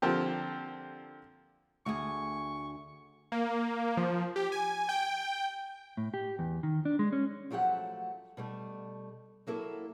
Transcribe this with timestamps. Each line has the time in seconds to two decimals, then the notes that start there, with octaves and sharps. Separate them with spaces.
0.02 D3 F3 A#3 C4 G4
1.86 D2 G#4 C#6
3.32 A#3
3.97 F3
4.36 G4
4.52 G#5
4.89 G5
5.97 A2
6.14 G4
6.39 E2
6.63 D#3
6.85 D4
6.99 G#3
7.13 C#4
7.51 F3 F#3 A3 G4 F#5
8.37 B2 G3 A3
9.47 F#3 A#3 E4 A4